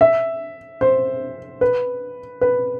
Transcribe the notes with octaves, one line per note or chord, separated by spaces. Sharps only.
E5
C5
B4
B4